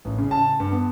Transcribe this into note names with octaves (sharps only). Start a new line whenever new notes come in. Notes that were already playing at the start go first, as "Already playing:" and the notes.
A1
C#3
A5
G2
B3